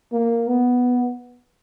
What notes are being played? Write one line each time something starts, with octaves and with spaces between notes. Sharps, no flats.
A#3
B3